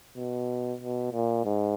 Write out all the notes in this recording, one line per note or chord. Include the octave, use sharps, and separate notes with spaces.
B2
B2
A#2
G#2